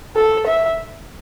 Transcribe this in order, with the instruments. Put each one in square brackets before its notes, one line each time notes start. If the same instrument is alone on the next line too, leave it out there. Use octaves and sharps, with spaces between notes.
[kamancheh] A4
E5